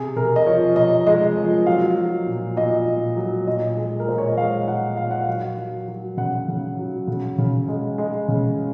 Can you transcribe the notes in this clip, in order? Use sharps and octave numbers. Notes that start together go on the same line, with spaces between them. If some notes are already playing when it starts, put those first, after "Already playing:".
Already playing: C3 G#4
C3 A#4
D#5
F3 C#5
C3 D#5
G#3 D#5
F3
F#3 F5
F#3
A#2
A#2 D#5
A#2
F#3
A#2 D#5
G#3
A#4
A#2 C5
C#5
D#5
G#3 F5
A#2 F#5
A#2 F5
F#5
F#3 F5
F#3
F#3
C#3 F#5
C#3
F#3
C#3
C#3
G#3
G#3
C#3